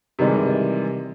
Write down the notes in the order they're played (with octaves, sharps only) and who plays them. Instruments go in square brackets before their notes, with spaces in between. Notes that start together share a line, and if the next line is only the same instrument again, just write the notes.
[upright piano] C3 D#3 E3 G3 G#3